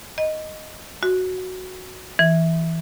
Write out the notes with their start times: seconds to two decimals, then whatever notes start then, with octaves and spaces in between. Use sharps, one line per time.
0.18 D#5
1.03 F#4
2.19 E3